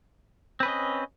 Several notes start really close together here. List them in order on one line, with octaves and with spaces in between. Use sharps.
C4 B4 C#4 D#5